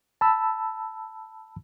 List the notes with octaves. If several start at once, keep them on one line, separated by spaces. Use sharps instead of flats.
A5 B5 E6